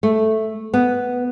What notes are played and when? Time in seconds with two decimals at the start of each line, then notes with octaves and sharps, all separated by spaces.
0.03 A3
0.74 B3